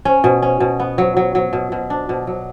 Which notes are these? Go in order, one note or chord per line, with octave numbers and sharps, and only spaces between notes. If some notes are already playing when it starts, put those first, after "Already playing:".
C#4
B2
C#4
B2
B3
F#3
F#3
F#3
B2
B2
D4
B2
F#3